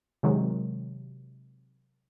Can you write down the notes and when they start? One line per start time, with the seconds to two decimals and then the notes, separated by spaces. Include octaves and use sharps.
0.23 C3 D#3 F#3 G#3